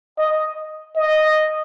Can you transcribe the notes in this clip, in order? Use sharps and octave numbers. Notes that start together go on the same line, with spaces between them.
D#5
D#5